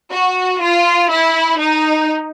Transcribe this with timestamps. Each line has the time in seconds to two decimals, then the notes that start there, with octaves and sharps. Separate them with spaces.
0.13 F#4
0.62 F4
1.10 E4
1.58 D#4